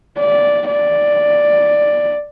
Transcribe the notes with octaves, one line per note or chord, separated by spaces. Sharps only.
D5
D5